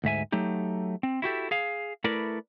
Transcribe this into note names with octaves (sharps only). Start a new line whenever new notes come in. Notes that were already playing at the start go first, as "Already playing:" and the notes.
D2 G#2 E5 G#5
F#3 A3 D#4 G4
C4
E4 F#4 G4 A4
G#4 F5
A3 E4 A#4 B4 D5